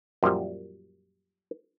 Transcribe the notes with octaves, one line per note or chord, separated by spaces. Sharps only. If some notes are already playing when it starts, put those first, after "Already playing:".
F#2 A#2 F3 G3